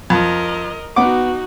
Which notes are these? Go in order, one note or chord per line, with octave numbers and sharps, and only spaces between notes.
F2 A#4 D#5
B3 D#4 F#4 F#5 D6